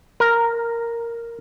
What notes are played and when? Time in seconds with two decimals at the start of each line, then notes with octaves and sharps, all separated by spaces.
0.20 A#4